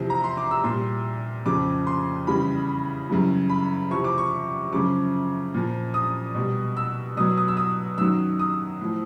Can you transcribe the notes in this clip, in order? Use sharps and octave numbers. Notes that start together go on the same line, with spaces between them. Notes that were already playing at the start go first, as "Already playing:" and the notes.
Already playing: E2 C3 F3
A#5
C6
D6
E6
A#2 G3 C6
F2 C#3 F3 D6
C6
E2 C#3 E3 G3 B5
F#2 C#3 E3 G3
B5
E2 C3 F3 C#6
D6
C#6
F#2 C#3 F3 D6
A#2 F3
D#6
B2 G3
E6
B2 F#3 D#6
D#6
E6
D#6
F#2 D#3 F#3 E6
D#6
A2 F3